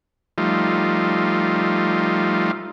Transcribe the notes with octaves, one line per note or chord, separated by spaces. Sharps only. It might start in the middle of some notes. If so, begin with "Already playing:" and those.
F3 G3 A3 D#4 F4